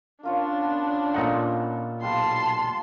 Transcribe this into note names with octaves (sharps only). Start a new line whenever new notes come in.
A#3 C#4 D4 F4 C#5
B3
A#2 B3 D#4 A4 C#5 F#5
B1 G3 G#3 F4 A5 C6